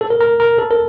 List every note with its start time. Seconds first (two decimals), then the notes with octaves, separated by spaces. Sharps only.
0.01 A4
0.10 A#4
0.20 A#4
0.40 A#4
0.59 A4
0.71 A#4